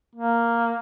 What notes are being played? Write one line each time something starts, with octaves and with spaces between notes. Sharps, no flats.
A#3